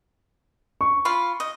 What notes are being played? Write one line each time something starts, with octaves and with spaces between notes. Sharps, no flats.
C#6
F4 F5 B5
D#5